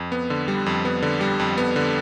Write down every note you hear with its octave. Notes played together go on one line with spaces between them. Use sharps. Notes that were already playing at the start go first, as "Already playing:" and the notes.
Already playing: F2
B3
D3
G3
F2
B3
D3
G3
F2
B3
D3